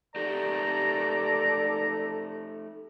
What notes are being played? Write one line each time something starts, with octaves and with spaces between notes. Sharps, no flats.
A3 D#4 G4 A4 D5 A#5